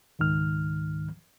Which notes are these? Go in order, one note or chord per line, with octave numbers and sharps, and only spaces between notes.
C#2 G#2 D#3 F6